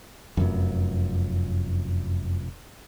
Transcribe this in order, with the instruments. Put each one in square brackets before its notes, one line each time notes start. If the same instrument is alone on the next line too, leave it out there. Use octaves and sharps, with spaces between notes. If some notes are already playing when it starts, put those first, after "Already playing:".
[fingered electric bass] F1 F#2